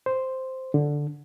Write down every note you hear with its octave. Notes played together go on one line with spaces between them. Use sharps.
C5
D3